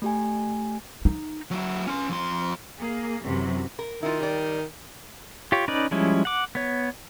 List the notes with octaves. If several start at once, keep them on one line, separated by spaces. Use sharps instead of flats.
A3 G4 G#5
D#4
F#3 E4
C#4 C6
F2 C6
A#3 G#4
F#2 C3 E3 F#3
A#4
D#3 E4 F4
G3 D5
F4 G4 C#5
C#4 D#4 B4 D5
F3 G3 G#3 C#4 E4
F#5 D6
B3 C#5